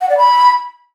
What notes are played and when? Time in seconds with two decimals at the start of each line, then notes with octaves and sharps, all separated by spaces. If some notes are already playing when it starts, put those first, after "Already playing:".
0.01 F#5
0.09 D5
0.18 B5